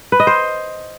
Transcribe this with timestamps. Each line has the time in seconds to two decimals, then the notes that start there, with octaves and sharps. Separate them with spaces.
0.12 B4
0.20 D#5
0.27 C5